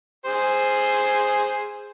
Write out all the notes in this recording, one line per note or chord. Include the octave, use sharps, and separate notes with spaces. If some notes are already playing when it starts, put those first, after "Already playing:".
G#4 C5